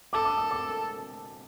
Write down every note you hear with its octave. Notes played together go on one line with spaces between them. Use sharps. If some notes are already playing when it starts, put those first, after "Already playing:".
A4 D6
D6
D#6
D6